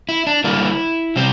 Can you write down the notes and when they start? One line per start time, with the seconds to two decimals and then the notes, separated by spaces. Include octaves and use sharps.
0.09 E4
0.27 D4
0.44 D3 G3 A#3 E4
1.16 C3 G3 C4